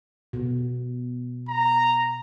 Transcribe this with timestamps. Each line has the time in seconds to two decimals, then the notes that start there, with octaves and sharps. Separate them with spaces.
0.33 B2
1.49 A#5